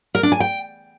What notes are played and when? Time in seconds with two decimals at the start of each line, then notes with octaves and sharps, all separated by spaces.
0.15 A#4
0.23 D4
0.32 G#5
0.40 G5